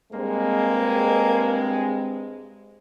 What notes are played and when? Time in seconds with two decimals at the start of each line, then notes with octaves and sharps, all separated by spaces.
0.13 G2 G#3 A#3 C4